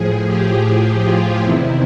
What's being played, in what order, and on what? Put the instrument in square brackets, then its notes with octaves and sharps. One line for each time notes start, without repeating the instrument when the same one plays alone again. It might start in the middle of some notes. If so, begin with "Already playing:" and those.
Already playing: [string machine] A2 F3 G#4
G4
F4
E2 C3 D#3 E4